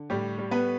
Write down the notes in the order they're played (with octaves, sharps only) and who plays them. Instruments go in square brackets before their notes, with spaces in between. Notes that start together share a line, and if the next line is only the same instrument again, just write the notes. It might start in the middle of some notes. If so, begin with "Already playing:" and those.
Already playing: [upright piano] D3
A2 G3 G4
G3
B3 B4